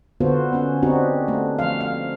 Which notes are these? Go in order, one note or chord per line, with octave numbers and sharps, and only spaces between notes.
D3 B3 F4 F#4 A4 C5
B3 C#4
C4 D4 D#4 F#4 G4
A3
F3 F5
F5